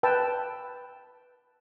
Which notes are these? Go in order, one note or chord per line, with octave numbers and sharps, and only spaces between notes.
B4 G5 A5 E6